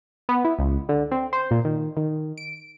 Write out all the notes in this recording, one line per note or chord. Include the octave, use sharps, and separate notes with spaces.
B3
E4
C#2
D3
C4
C5
A#2
D#3
D#3
D7